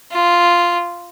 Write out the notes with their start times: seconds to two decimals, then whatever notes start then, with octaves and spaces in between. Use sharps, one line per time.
0.12 F4